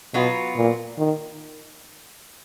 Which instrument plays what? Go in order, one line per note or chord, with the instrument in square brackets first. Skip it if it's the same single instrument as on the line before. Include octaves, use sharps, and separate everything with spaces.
[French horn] B2 [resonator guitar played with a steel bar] F#3 B3 F4
[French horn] A#2
D#3